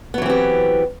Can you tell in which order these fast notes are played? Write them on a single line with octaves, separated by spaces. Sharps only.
B3 F#3 E3 C4 G4